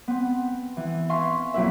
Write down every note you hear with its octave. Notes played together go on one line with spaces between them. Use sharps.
B3 C4
E3
E5 F5 G#5 C6 C#6
F2 A#2 F#3 E4 B4 E5